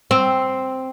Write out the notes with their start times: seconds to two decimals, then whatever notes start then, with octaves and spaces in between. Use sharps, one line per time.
0.11 C4